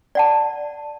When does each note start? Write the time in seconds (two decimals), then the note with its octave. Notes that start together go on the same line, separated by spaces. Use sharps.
0.15 D5 F#5 A5